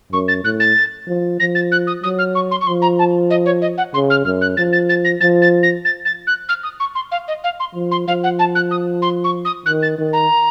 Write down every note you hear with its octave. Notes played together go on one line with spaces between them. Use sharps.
F#2 C#6
A6
A2 F#6
A6
F3
F3 A#6
A6
F#6
D#6
F#3 D#6
F6
C#6
C6
C#6
F3 C6
A#5
A5
D#5
C#5
D#5
F#5
C#3 C6
F6
F#2 F6
F#6
F3 A6
A6
A6
A#6
F3 A6
A6
A#6
A6
A6
F#6
F6
D#6
C#6
C6
F5
D#5
F5
C6
F3
C6
F3 F5
F#5
A5
F#6
D#6
C6
C#6
D#6
D#3 F#6
A6
D#3
A#5